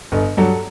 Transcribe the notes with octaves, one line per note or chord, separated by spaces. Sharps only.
G1 D#5
G2 F#3 A4